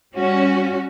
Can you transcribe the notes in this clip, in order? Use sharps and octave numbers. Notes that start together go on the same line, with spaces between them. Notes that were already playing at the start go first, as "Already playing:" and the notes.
G3 C#4 F#4